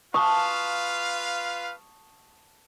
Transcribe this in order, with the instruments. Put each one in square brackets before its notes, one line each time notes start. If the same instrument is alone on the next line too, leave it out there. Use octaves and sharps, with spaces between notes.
[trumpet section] F4 B4 F5 [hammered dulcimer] A5 [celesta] C#6 D#6